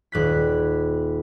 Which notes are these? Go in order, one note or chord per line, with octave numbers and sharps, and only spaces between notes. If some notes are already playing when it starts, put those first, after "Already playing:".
D#1 F#6 B6